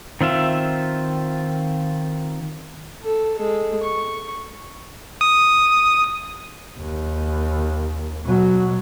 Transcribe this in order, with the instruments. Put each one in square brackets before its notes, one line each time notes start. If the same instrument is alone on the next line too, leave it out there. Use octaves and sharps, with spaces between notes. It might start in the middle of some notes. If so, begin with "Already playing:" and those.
[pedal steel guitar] D#3 C4 F4 E5
[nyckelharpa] A4
G#3 A4
C#6
[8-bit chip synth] D#6
[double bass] D#2
B2 F#3